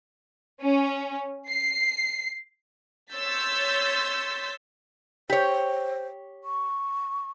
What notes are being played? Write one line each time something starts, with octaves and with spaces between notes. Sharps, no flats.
C#4
C7
C#5 C6 E6 G6 A6 B6
G4 C5 C#5
C#6